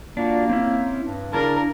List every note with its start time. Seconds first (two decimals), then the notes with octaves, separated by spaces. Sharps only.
0.17 A#3 D4 F4 F#4
0.49 C4 C#4 E4
1.00 G2
1.33 C#3 D4 E4 A#4 A5